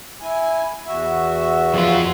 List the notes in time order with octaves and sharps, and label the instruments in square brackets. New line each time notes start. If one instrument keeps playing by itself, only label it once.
[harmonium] E4 G#5
E2 F#4 E5
[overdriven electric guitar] F2 F4